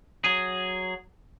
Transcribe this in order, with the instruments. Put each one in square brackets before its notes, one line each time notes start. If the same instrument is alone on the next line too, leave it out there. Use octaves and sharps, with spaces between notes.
[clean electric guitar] F#3 G#4